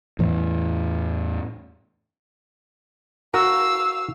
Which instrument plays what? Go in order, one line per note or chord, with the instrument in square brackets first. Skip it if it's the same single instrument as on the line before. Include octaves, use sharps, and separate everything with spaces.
[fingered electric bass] E2 A2 E3
[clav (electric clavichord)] F#4 A#4 [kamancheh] F5 E6